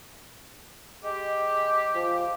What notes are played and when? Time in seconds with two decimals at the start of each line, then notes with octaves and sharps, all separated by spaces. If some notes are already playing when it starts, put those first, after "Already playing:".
1.04 G#3 G4
1.95 F3